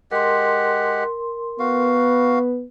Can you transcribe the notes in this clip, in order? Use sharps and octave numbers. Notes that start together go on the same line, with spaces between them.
G#3 G4 A#4 F#5 C6
B3 F#4 F5